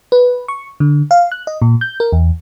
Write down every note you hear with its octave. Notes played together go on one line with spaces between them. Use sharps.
B4
C#6
D3
F5
F#6
D#5
A#2
G6
A#4
E2